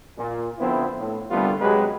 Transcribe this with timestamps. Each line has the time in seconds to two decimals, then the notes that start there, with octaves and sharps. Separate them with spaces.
0.18 A#2
0.59 D3 F3 B3 C4 E4
0.99 A2
1.31 C2 D3 G3 A3 B3 F4
1.61 C3 F#3 G#3 G4 G#4 B4